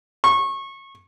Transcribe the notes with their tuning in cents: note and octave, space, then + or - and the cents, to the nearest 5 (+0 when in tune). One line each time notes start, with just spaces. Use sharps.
C#6 -25